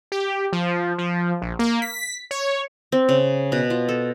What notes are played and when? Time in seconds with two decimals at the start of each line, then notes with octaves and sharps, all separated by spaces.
0.12 G4
0.53 F3
0.98 F3
1.42 A#1
1.59 A#3
1.82 B6
2.31 C#5
2.92 C4
3.09 C#3
3.52 B2
3.70 F4
3.89 A4